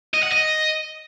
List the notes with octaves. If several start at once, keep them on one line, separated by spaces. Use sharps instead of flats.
D#5
F#5
D#5